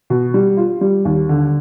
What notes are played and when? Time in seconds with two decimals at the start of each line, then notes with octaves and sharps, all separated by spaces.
0.10 B2
0.34 G3
0.57 F4
0.81 G3
1.05 D#2
1.29 D3